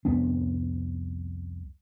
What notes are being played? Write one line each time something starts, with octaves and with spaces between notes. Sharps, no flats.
C2 F2 B3 D4